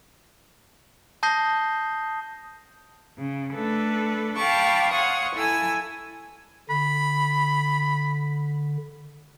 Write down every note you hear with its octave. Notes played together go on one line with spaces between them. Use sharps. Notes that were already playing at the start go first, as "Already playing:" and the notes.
A5 D#6 G6 A#6 C7 G7
C#3
A3 D4 A4 B4
F5 G5 A5 B5 C#6 D6
C#5 F5 F#5 C6 C#6 D#6
E4 A4 G#5 E6
D3 B5